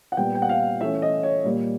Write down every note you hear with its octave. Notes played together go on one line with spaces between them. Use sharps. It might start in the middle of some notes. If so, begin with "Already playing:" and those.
F#5
A#2 G3 B3 G5
G5
F#5
F5
E3 A3 C#4 E5
D#5
C#5
A#2 G3 A#3